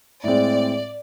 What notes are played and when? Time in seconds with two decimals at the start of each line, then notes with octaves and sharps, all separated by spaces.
0.24 A2 G#3 C4 D5